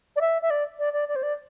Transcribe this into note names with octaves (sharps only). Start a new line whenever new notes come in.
D5
E5
E5
D5
D5
D5
D5
C5
D5